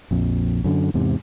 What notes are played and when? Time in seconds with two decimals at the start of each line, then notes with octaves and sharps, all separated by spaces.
0.11 A#1 F2
0.64 F#2 D3
0.94 E2 G#2 C3